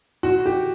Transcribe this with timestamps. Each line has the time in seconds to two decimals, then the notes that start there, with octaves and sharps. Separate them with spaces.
0.23 F#4
0.46 G4